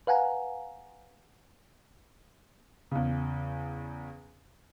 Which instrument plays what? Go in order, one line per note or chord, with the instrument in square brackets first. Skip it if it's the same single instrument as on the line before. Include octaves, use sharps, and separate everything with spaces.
[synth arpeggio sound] B4 F5 F#5 G#5 A#5
[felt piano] E2 C#3